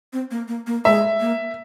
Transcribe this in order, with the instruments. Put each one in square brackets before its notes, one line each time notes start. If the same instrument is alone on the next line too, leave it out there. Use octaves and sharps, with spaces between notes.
[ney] C4
A#3
A#3
A#3
[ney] G#3 [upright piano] E5
[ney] A#3